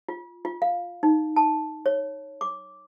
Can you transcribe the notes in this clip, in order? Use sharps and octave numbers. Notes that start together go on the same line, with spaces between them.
F4
F4
F5
D#4
A5
C#5
D6